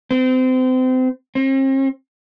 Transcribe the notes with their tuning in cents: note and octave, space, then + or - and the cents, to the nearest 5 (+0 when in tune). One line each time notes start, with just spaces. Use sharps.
C4 -30
C4 +45